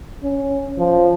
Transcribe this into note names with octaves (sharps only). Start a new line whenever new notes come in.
C#4
F3